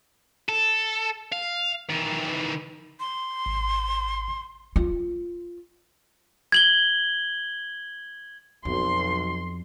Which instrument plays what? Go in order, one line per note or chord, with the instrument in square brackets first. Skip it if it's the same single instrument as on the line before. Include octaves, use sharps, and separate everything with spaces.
[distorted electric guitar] A4
F5
D#3 E3
[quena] C6
[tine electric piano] G#1
[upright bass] F4
[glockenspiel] G#6 F#7 G7
[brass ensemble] B1 [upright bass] F2 [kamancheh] C6